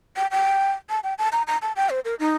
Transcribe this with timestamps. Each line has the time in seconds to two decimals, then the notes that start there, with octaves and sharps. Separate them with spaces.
0.17 G5
0.31 G5
0.90 A5
1.04 G5
1.18 A5
1.32 A#5
1.47 A#5
1.62 A5
1.76 G5
1.90 C5
2.05 A#4
2.20 D#4